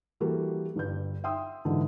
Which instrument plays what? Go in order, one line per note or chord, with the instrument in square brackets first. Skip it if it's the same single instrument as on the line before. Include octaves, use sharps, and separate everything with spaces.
[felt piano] E3 G3 A#3 F#4 A4
G1 G2 G6
E5 G5 C6 D#6 E6
G#2 D3 E3 F#3 D4